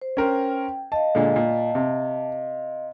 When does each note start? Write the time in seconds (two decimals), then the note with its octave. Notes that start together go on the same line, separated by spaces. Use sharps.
0.01 C5
0.17 C#4 A#4 C5 G5
0.92 D#5 F5 A5
1.15 A#2 D3 G#3
1.36 A#2
1.75 C3